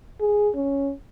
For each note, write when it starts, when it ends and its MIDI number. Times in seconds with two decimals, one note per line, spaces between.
0.20 0.49 68
0.55 0.91 61